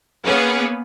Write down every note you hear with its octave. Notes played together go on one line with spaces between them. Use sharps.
A#3 B3 C#4 G#4 B4